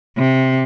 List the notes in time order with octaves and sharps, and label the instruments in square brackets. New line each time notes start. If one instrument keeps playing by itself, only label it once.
[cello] C3